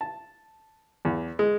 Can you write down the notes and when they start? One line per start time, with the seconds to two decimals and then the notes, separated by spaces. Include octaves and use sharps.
0.01 A5
1.05 E2
1.39 G#3